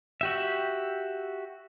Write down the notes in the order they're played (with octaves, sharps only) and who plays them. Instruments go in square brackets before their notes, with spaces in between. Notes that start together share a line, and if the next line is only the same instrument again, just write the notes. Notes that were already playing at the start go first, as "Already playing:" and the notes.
[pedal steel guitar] F#4 G4 E5